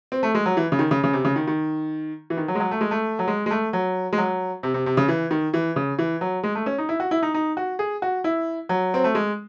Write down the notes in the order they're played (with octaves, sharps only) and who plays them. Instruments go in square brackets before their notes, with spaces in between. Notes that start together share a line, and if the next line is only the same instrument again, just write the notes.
[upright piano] C4
A3
G#3
F#3
E3
C#3
D#3
C#3
C#3
C3
C#3
D#3
D#3
E3
D#3
F#3
G#3
F#3
A3
G#3
A3
F#3
G#3
G#3
A3
F#3
G#3
F#3
C3
C3
C3
C#3
E3
D#3
E3
C#3
E3
F#3
G#3
A3
C#4
D#4
E4
F#4
E4
D#4
D#4
F#4
G#4
F#4
E4
F#3
C4
A3
G#3